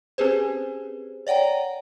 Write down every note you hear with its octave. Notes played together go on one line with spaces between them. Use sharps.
C4 C#4 G4 G#4 B4 C5
C#5 D5 F#5 G5 A#5